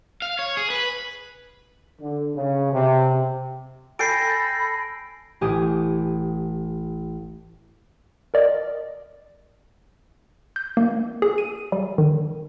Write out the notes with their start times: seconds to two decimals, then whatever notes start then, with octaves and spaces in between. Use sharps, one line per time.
0.22 F5
0.39 C#5
0.57 G#4
0.70 B4
2.01 D3
2.35 C#3
2.73 C3
3.99 A4 G5 G#5 B5 A#6 C7 D7
5.41 A1 G4 G#5 D#6
8.34 A#4 D5 D#5
10.56 G6
10.77 A#3
11.22 G#4
11.38 D#7
11.72 G3
11.98 D#3